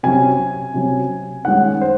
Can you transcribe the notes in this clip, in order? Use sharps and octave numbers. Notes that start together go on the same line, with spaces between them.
C3 F#3 C#4 G#5
C3 F#3 C#4
D#3 G#3 C#4 F#5
C5